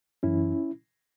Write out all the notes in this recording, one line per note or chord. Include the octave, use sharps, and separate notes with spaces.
F#2 E3 C#4 E4